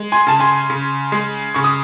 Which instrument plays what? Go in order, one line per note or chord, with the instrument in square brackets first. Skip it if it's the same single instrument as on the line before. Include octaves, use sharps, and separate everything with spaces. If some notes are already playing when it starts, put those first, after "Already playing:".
Already playing: [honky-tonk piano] G#3
G#5 C6
C#3 A5
G#5 C6
C#3
G#3
C#3 C#6
D#6